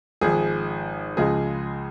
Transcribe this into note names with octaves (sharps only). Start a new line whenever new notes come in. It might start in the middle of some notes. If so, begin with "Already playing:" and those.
G#1 G#2 F3 G#4
C#2 C#3 F3 G#3 G#4